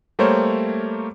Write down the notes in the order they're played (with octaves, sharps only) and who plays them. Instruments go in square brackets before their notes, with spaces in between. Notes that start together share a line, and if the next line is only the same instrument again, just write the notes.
[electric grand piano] G3 A3 A#3 A#4 C5 C#5